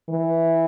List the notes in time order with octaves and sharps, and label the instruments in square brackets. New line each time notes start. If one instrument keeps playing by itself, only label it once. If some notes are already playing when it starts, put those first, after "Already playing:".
[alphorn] E3